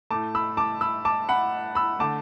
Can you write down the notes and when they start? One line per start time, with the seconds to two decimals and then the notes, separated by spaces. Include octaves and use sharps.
0.11 A2 A3 A5 D6
0.35 B5 E6
0.57 A5 D6
0.81 B5 E6
1.05 A5 D6
1.29 F#5 B5
1.75 B5 E6
1.99 D3 A3 A5 D6